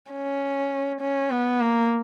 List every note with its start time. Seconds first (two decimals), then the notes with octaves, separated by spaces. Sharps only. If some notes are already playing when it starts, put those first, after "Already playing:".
0.12 C#4
1.01 C#4
1.31 B3
1.61 A#3